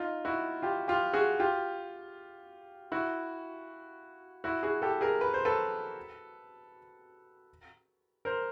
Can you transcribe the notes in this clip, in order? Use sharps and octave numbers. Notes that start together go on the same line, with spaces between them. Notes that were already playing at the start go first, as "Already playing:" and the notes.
Already playing: D#4 F4
E4 F#4
F4 G4
F4 G4
F#4 G#4
F4 G4
E4 F#4
E4 F#4
F#4 G#4
G4 A4
G#4 A#4
B4
C5
A4 B4
A#4 C5